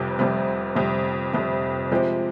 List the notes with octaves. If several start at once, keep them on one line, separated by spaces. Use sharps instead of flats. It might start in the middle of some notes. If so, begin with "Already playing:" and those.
Already playing: F1 F2 C3 G3
F1 F2 C3 G3
F1 F2 C3 G3
F1 F2 C3 G3
C3 F3 G#3 C4 G4